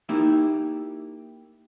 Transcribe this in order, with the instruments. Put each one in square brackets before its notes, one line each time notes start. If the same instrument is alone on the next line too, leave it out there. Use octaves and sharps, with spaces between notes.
[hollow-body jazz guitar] A#3 D#4 E4 G4 E5